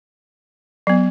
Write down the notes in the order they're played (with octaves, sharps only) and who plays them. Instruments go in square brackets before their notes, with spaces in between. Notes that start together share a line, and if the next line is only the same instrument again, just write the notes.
[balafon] F#3 B3